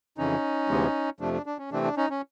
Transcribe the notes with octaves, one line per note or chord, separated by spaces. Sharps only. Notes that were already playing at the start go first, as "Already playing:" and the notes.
F2 C#3 E3 C#4 D#4
D2 C3 E3 G#3 B3
F2 C3 F3 A3 D4
D4
D4
C#4
C3 E3 A3 C4 D4
D4
C#4 D#4
C#4